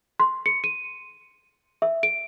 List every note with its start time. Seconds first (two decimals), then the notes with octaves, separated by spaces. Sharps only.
0.20 C6
0.46 C#7
0.64 D#7
1.82 E5
2.03 D7